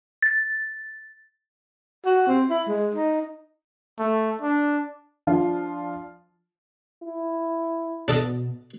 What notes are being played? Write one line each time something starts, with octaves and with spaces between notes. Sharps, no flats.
A6
F#4
C4
E4
G#3
D#4
A3
D4
F3 D4 F4
E4
B2 D4 A4 D#5